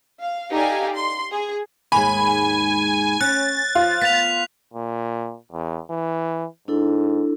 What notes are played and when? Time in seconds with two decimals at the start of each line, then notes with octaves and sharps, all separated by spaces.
0.22 F5
0.51 D#4 G4 A4 D5 F5 G#5
0.95 C6
1.32 G#4
1.92 D#2 G#2 G#3 G#5 B5
3.21 C#4 F#6 A6
3.75 F3 F4
4.02 B3 B6 F7
4.73 A#2
5.52 E2
5.90 E3
6.68 G#2 D4 E4 A4